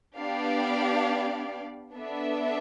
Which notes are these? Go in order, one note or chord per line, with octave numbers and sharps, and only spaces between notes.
B3 D4 G4 D5 F5
B3 D4 A4 E5